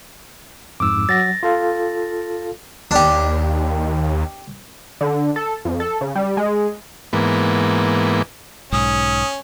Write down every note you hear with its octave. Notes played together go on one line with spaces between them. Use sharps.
F2 G#2 D6 E6
F#3 F#5 A6 A#6
F4 A4 F5
D#2 D4 G4
D3
A4
F2
A4
C#3
G3
G#3
G#2 E3 A#3 B3
B1 G#2 C#4 D#6